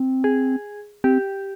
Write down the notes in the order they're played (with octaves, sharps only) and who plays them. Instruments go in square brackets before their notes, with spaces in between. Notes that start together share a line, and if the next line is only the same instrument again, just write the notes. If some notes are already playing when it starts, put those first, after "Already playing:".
Already playing: [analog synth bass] C4
[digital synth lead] G#4
[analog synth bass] C4 [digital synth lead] G4